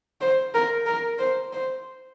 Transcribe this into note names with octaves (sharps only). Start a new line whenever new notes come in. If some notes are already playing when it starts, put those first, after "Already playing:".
C5
A#4
A#4
C5
C5